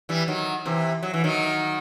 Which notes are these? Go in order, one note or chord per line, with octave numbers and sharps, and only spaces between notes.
E3 G3
D#3 F#3
C3 E3
F#3
E3
D#3 F#3